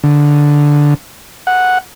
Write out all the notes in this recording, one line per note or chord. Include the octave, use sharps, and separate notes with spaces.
D3
F#5